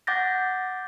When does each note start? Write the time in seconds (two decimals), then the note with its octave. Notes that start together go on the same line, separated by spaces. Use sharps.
0.07 F#5 D6 G6 A6 A#6